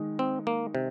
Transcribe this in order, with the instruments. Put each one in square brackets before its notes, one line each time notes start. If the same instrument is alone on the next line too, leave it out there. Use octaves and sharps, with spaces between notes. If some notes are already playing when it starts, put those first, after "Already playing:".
Already playing: [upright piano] D#3 G#3 D#4
[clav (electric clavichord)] C4
A#3
C3